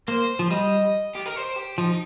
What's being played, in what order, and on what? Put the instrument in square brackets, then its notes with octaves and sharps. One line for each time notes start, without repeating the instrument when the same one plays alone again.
[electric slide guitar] A#3 [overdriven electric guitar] C5
[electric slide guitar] F3
[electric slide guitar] G3 [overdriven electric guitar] D#5
[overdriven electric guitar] G4
A#4
C5
G4
[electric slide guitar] F3 [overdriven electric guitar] D#4